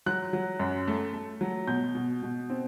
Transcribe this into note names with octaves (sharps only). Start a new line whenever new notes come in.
F#3 F#6
F#3
F#2
A3
A3
F#3
B2 G6
B2
B2
C4